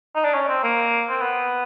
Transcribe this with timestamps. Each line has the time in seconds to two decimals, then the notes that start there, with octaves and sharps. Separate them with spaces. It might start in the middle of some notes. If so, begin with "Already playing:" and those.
0.15 D#4
0.24 D4
0.34 C#4
0.49 C4
0.63 A#3
1.10 C4
1.21 B3